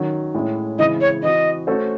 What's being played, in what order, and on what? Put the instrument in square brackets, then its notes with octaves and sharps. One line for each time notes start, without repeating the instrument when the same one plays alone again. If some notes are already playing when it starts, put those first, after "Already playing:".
Already playing: [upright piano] D#3 F#3 C#4
A2 G#3 C#4 E4
[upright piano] C#3 E3 G#3 C4 E4 [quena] D#5
[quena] C#5
[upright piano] E3 C4 F#4 [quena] D#5
[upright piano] A3 C#4 F#4 A4 C5